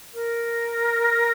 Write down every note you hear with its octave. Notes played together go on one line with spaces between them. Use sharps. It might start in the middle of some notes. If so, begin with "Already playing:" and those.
A#4